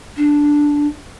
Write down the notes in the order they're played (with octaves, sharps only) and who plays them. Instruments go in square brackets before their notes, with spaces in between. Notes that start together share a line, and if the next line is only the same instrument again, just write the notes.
[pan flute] D4